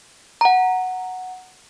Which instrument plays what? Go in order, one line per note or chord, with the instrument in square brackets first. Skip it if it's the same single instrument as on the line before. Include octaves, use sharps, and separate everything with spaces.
[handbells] F#5 A#5